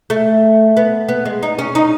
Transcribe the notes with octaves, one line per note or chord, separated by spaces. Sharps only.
A3
B3
B3
G#3
D#4
C#4
D#4